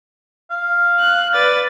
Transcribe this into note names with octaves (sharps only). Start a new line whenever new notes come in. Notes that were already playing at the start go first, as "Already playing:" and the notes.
F5
F#6
B4 D5 A6